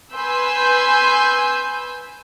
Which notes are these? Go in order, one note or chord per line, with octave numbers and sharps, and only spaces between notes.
B4 G#5 C6 E6 G6